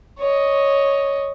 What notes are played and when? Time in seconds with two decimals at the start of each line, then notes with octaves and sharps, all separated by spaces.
0.19 C#5 D#5